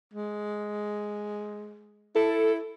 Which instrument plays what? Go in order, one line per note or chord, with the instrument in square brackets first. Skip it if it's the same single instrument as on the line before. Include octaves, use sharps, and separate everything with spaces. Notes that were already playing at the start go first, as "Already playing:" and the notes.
[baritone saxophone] G#3
[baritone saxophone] E4 [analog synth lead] A4